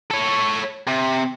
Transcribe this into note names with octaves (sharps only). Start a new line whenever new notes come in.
A4 C#5
C3